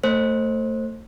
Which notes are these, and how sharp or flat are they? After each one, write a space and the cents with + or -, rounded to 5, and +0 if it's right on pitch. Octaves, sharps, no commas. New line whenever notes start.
A3 +25 C5 +20